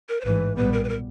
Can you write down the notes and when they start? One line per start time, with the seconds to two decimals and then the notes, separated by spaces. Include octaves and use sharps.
0.09 A#4
0.21 C5
0.25 A1 G#2 E3 B4
0.56 B1 A#2 G3 B3 B4
0.73 A#4
0.84 B4
0.89 A#4